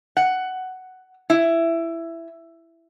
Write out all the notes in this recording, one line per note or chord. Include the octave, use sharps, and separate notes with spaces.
F#5
E4